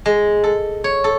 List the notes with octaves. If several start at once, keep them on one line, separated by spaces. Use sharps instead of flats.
G#3
A4
C#5
A4